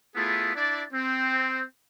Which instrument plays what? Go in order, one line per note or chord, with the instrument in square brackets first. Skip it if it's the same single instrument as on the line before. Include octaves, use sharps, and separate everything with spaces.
[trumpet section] A3 B3 E4 F4 G#4
D4 E4 D5
C4